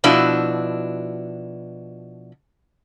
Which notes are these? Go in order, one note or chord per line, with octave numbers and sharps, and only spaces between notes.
B2 F3 D4 E4 F#4